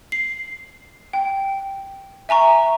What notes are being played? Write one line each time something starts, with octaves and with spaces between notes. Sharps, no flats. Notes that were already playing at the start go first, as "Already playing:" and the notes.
C7
G5
E5 G#5 A#5 C#6